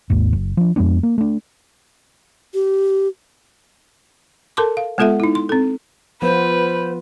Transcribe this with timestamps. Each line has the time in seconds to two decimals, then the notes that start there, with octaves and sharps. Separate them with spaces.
0.10 G#1 D#2 G#2
0.33 F#1
0.57 F3 D4
0.76 F2 G#3 B3 D4
1.03 A#3
1.18 A3 D4
2.53 G4
4.57 A4 A#4 A5 C6 D6
4.77 F5
4.98 G#3 B3 F4 A4 E5 F#5
5.20 D#4 E4
5.35 C6
5.49 C4 A4
6.22 F3 B3 F4 B4 C5